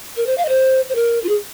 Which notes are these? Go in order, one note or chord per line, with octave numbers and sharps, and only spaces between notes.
A#4
C5
F5
D#5
C5
C5
A#4
F4
G#4